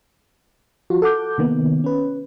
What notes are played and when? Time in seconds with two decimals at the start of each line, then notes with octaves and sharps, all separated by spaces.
0.90 F3 F4 F#4
1.02 A4 F#5 D6 G6
1.38 C3 D#3 A#3 B3
1.84 C#4 B4